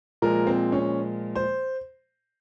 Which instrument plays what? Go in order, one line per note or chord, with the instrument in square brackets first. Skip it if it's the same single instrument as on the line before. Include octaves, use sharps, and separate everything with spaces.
[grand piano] A#2 F3 G#3 A#4
C4
C#4
C5